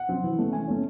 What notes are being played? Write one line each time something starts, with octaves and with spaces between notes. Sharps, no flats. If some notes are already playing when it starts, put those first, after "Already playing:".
Already playing: F#5
F#3 C4
E3
A3 C#4
E3 G#5
A3 C#4